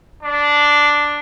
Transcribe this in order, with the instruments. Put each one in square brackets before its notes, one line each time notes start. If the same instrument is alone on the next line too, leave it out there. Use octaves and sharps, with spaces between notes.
[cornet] D4